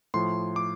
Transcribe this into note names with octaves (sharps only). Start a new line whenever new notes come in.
A2 F3 C6
D6